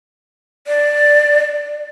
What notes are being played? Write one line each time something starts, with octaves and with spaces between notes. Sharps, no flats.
D5